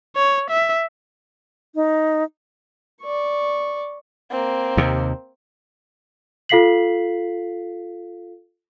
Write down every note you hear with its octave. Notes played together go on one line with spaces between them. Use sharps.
C#5
E5
D#4
D5 C#6
A#3 C4
D#2 C3
F4 A4 F5 B6 C7 F#7